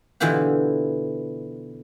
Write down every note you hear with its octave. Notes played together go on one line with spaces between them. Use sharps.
B2 D3 E3 E4 F4 G4